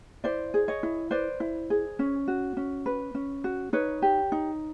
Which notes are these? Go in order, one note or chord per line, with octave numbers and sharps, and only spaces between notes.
E4 C5 D5
G#4
C#5 D#5
E4
B4 C5 D5
E4
G#4
C#4
F#4
C#4
B4
C#4
F#4
D#4 B4 C#5
G4
D#4